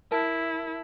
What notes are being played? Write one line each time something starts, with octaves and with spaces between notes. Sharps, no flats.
E4 A#4 A5